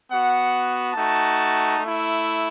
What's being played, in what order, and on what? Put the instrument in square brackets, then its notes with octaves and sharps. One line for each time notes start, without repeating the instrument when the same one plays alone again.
[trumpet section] B3 F#4 F#5
A3 D#4 F#4 A5
A3 E4